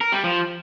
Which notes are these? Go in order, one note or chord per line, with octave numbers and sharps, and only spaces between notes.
A#4
G3
F3